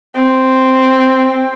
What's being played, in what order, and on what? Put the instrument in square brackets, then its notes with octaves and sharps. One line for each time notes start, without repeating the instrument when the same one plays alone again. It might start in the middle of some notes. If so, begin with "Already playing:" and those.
[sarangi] C4